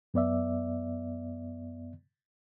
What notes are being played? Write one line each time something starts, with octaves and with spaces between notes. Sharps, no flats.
F#2 B3 D5 E5